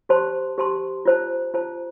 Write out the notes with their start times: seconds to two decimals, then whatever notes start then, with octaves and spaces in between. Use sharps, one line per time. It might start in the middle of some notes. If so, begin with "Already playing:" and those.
0.09 G4 C5 A5 C6
0.58 G4 C5 A5 C6
1.05 F4 C5 A5
1.54 F4 C5 A5